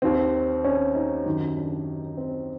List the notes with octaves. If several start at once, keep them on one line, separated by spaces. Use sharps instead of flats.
D#2 D#3 C4
C#4
D#4
F#2 D#3
D4
C4